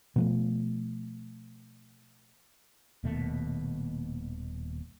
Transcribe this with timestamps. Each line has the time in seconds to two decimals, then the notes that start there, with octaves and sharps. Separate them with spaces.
0.16 B2 F3 A3
3.04 D#1 D#2 B2 A3